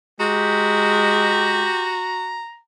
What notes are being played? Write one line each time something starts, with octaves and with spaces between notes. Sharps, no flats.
G#3 F#4 G4 A#5